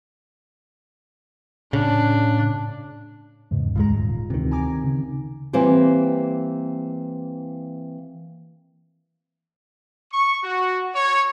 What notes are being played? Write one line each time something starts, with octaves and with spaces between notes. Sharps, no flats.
A2 C#3 D4
E2 G#2 C#3
D2 G#2 G#3 F4 A#5
D#1
D2 C3 D#3 E3
G#5 A#5 D6
C#3
E3 G3 A#3 C4 G4
C#6
F#4
C#5